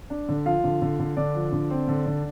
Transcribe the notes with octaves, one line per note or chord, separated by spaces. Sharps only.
D4
D3
F3 F4 F5
D3
D3
D3
D3 D4 D5
F3
D3
C4
D3
D3